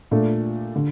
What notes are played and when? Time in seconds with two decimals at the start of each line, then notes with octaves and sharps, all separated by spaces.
0.11 A#2 A3 D4 A4
0.76 D3